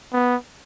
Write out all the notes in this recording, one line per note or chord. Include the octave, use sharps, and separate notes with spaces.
B3